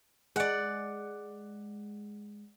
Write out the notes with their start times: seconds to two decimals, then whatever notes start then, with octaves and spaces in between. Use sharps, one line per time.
0.36 G#3 D5 F#5